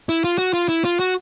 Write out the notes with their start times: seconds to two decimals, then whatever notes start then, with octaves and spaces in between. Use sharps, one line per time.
0.09 E4
0.24 F4
0.38 F#4
0.53 F4
0.69 E4
0.85 F4
1.00 F#4